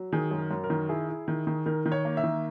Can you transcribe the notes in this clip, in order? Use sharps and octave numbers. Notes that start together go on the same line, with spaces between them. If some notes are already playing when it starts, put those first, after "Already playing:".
Already playing: F#3
D#3 G#4
F#2 G#4
A#4
F#2
A#4
D#3
E4 G#4
E4
D#3
D#3
D#3 A#4
D#3
C#5
A#3
E5
D#3